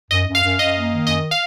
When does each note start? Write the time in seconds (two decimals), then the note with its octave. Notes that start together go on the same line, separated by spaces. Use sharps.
0.11 F#2 D#5
0.27 F#2
0.35 F5
0.44 F#2
0.59 F#2 D#5
0.75 A#3
0.91 D#3
1.07 F#2 D#5
1.31 F5